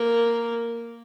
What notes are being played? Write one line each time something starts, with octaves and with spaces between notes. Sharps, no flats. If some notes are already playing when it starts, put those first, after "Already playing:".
Already playing: A#3